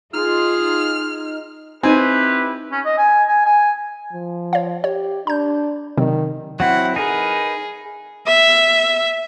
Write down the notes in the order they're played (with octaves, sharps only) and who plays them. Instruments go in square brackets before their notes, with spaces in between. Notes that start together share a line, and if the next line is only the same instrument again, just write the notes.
[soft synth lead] D#4 [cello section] F4 [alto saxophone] G#4 [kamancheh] F6
[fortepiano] C4 [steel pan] D#4 G#5 [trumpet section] E4 G4 B4
[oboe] C#4
D#5
G#5
G#5
G#5
[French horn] F3
[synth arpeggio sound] C#5 F5
[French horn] G4 [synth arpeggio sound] C#5
[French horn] D4 [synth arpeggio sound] A#5 G6
[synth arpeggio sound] C3 F#3 C4 [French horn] D#3
[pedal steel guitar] F#3 C4 E4 [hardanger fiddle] F#5
[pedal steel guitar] D#4 A#4 B4 [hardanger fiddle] G#4
[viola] E5